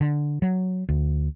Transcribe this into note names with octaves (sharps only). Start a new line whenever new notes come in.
D3
F#3
D2